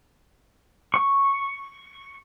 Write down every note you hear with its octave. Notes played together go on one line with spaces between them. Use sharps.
C#6